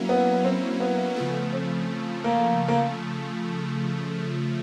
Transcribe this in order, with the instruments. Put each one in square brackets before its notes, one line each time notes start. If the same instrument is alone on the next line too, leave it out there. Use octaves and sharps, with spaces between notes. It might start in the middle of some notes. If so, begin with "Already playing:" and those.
Already playing: [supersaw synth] F#3 A#3 C#4 E4
[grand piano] B3
C4
B3
[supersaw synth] C#3 F3 A3
[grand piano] C4
A#3
A#3